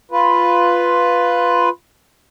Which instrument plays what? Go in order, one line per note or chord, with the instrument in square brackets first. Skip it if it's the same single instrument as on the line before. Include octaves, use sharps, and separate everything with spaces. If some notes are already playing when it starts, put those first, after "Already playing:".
[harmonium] F4 B4